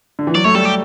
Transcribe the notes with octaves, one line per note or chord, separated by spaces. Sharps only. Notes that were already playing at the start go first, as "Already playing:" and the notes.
D3
E3
F#3 D5
A3 C#5
G3 A4
G4